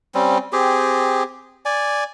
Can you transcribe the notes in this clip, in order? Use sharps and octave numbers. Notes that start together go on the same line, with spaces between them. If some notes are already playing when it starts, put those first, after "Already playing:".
G3 C4 C#4
C4 G4 G#4
D5 G#5